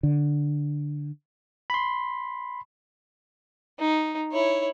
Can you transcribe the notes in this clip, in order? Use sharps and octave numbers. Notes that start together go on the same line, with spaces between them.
D3
B5 C6
D#4
E4 C#5